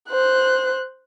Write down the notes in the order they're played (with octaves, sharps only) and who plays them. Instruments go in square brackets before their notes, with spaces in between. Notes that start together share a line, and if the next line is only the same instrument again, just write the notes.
[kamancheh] C5 F#6